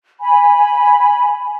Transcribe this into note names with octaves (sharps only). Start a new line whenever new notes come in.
G#5 B5